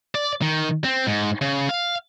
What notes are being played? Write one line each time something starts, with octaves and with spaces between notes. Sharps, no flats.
D5
D#3
C4
G#2
C#3
F5